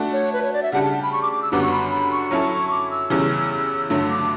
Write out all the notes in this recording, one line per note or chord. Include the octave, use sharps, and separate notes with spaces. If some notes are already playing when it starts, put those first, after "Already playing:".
Already playing: A3 D4 F#4
C#5
B4
C#5
D5
E5
C#3 G3 D4 G4 F#5
A5
A5
B5
C#6
D6
D6
E6
F#2 D3 G3 B3 F#4 D6
C#6
B5
B5
C#6
F#3 C#4 E4 A4
D6
E6
E2 C#3 E3 G3 C#4
G2 D3 F#3 A3 E6
D6